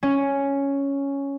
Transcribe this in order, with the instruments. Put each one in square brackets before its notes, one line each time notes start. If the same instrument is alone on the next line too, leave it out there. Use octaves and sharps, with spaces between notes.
[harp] C#4